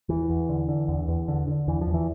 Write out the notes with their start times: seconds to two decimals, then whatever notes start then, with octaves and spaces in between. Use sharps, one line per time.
0.09 E2 E3
0.30 E2
0.49 D3
0.68 D3
0.88 E2
1.08 E2
1.28 D3
1.47 D3
1.67 E2 E3
1.81 F3
1.87 E2
1.94 E3